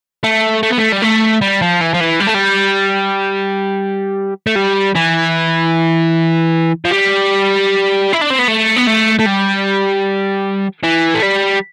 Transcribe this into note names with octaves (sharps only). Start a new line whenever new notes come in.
A3
A3
B3
A3
G3
A3
G3
F3
E3
F3
E3
G3
A3
G3
A3
G3
E3
F3
G3
E4
D4
C4
B3
A3
B3
A3
A3
G3
E3
A3
G3